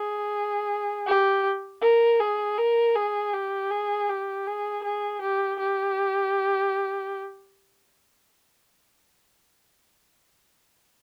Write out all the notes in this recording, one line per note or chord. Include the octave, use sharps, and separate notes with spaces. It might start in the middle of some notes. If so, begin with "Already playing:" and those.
Already playing: G#4
G4
A#4
G#4
A#4
G#4
G4
G#4
G4
G#4
G#4
G4
G4